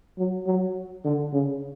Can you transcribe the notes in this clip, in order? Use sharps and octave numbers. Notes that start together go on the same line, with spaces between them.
F#3
F#3
D3
C#3